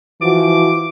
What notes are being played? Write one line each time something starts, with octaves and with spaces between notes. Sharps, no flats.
E3 F3 F#4 D6